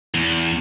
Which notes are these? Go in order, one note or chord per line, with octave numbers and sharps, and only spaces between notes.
E2